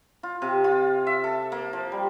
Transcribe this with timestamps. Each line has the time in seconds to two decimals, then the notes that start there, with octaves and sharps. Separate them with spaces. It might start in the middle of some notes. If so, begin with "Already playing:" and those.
0.23 F4
0.42 C3
0.64 F4
1.07 E5
1.24 A4
1.52 A#3
1.73 F3
1.92 G3